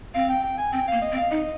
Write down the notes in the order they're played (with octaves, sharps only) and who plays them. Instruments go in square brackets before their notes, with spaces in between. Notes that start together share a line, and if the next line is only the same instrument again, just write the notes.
[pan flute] C4 [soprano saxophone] F5
[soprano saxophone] G5
G5
G#5
[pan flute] C4 [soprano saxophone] G5
[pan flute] A#3 [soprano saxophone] F5
[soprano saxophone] D#5
[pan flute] C4
[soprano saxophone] F5
[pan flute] D#4 [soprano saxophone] D#5